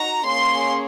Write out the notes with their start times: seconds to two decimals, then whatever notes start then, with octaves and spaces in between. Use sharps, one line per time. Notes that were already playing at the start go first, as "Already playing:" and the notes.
Already playing: D#4 F#4 A#5
0.25 A#3 C#4 G#4 C6